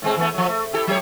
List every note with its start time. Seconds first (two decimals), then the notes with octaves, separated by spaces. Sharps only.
0.02 A2 G#3 C4
0.17 E3 A3 B3
0.34 F3 F#3
0.49 A3
0.73 E4 G4 A4
0.87 F#3 G4 C#5